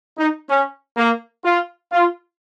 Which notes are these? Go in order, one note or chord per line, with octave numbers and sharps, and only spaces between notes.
D#4
C#4
A#3
F4
F4